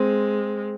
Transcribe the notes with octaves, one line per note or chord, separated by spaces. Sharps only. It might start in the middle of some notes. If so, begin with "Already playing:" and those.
Already playing: G#3 C4